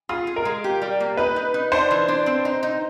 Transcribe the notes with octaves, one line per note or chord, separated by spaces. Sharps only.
F4 G#4
G#4
A#4
G#3
G4
G3
A#3
D#4 B4
D#4
D#4
D4 C5
E3
D4
C4
D#4
D#4